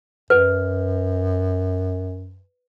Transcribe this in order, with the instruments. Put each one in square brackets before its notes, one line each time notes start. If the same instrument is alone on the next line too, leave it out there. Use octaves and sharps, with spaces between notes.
[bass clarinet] F#2 [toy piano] B4